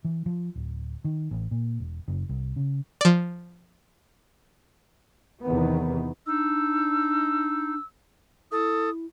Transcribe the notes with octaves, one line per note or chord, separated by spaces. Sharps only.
E3
F3
D1
D#3
A1
A#2
E1
F#1
C2
C#3
F3 D5
E2 C3 D#3 B3
D4 D#4 E6
E4 A4 D#6